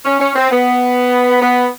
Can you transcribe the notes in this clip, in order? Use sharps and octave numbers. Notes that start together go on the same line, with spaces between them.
C#4
C#4
C4
B3
B3